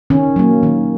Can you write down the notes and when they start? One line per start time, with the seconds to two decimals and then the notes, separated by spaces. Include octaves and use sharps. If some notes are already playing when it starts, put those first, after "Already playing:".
0.10 D#3 C#4
0.36 F#3 A#3
0.63 D#3